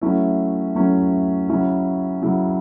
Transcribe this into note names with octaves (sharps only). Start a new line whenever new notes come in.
F#3 A3 C#4 E4
F#3 A3 C#4 E4
C#3 F#3 C#4 E4
C#3 F#3 C#4 E4